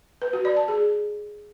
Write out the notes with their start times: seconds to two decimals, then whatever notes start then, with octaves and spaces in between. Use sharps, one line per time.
0.22 B4
0.33 F#4
0.45 D5
0.57 A5
0.68 G#4